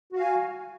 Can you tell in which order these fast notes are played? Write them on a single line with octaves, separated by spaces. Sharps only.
F#4 F5 G#5